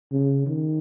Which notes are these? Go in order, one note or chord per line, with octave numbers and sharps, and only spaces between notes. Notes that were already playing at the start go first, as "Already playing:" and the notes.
C#3
D#3